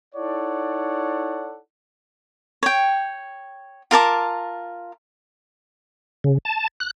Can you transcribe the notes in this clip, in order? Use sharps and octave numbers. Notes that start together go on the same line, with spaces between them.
D#4 E4 A4 C#5 D5 F#5
C#5 G5
F4 A#4 A5 D6
C#3
A5
F#6